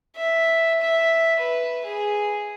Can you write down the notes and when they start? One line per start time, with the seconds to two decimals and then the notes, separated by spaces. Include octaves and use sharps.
0.16 E5
0.81 E5
1.40 B4
1.85 G#4